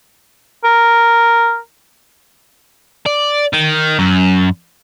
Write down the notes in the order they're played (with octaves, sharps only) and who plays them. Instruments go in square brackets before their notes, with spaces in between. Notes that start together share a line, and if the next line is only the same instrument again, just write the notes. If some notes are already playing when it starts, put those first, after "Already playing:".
[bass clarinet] A#4
[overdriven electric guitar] D5
D#3
F#2